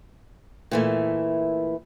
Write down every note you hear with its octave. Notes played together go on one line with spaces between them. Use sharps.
A#2 E3 A3